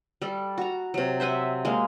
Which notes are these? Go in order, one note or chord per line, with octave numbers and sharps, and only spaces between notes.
G3 A4
F#4 A#5
C3 F#3
C5 E5 F#5 G#5
G#3 A#3